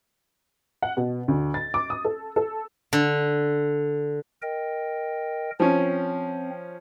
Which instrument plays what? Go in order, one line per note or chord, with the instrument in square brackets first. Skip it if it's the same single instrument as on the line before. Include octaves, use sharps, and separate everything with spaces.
[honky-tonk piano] F#5
B2
D2
A6
D6
D#6
A4
A4
[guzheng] D3
[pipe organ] A#4 D#5 G5
[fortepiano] F3 C#4 [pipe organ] C4